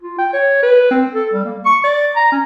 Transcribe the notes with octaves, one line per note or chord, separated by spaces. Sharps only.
F4
G5
C#5
B4
C4
A4
G3
A#3
C#6
D5
A#5
C#4